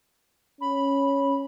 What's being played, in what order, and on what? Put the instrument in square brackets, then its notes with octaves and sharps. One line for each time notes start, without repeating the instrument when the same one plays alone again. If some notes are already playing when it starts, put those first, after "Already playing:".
[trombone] C#4 [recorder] B5